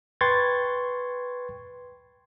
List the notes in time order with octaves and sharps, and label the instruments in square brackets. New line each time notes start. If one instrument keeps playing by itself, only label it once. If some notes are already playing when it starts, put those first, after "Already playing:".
[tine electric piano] B4 G5 C6 C#6 G#6 A6